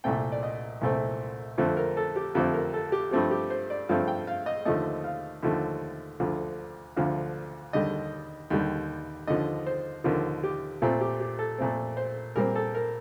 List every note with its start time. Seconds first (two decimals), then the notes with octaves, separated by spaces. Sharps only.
0.04 C2 A#2 A3 C4 G5
0.32 D5
0.43 D#5
0.81 C2 A#2 A3 C4
1.58 F2 D3 F3 A3 C4
1.77 A#4
1.97 A4
2.16 G4
2.35 F2 D3 F3 A3 C4 G4
2.54 A#4
2.74 A4
2.92 G4
3.11 G2 F3 A3 C4 G4
3.31 G4
3.50 C5
3.70 D5
3.89 G2 F3 A3 C4 F5
4.08 G5
4.27 F5
4.46 D#5
4.65 D#2 D3 F3 A3 D#5
5.04 F5
5.43 D#2 D3 F3 A3
6.20 D2 D3 F3
6.97 D2 D3 F3 F5
7.73 D#2 D3 G3 D#5
8.50 D#2 D3 G3
9.27 D#2 D3 F3 D#5
9.67 C5
10.04 D#2 D3 F3 A#4
10.44 G4
10.82 A#2 A3 C4 F4
11.01 G4
11.20 G4
11.39 A4
11.58 A#2 A3 C4
11.97 C5
12.36 A#2 G3 C4 A#4
12.55 A4
12.75 A#4